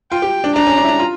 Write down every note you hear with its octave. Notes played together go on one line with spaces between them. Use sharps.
F4 G5
G4
D4
D4 A#5
C#4
D4
E4
D4
F4